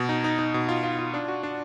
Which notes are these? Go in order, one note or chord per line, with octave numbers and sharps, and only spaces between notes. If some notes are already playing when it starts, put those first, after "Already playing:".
Already playing: B2
D#4
D#4
D#4
B2
F4
F4
F4
D4
F#4
D4